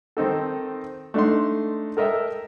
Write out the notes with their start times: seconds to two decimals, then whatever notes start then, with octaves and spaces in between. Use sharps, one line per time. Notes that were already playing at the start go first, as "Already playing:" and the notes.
0.17 D#3 C4 D#4 A4
1.14 A3 D4 D#4 C6
1.97 A4 A#4 D#5 E5 G5